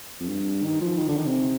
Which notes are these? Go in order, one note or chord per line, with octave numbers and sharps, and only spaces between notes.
F2
G2
D#3
F3
D#3
D3
D#3
C3